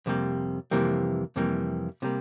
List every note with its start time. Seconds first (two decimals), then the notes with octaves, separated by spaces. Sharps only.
0.06 F2 C3 E3 G3 A#3
0.71 F2 C3 E3 G3 A#3
1.36 F2 C3 E3 G3 A#3
2.02 C3 E3 G3 A#3